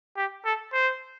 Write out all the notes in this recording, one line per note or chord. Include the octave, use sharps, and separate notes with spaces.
G4
A4
C5